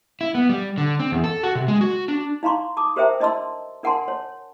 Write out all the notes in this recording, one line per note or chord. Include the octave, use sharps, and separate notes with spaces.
E4
B3
G3
D3
C4
E2
A4
F#4
C3
G#3
F#4
D4
D#4 F5 A#5 C6 C#6
A5 D6 D#6
G4 A#4 C5 E5 G5 A#5
D4 D#5 A5 C6 E6
D4 A#4 F#5 G#5 A5 C6
C#5